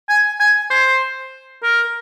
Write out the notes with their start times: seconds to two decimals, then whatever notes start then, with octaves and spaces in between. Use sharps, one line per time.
0.09 G#5
0.40 G#5
0.71 C5
1.63 A#4